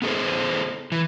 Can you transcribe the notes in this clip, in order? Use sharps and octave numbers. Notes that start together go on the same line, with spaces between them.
B3 G#4 A4 C5
E3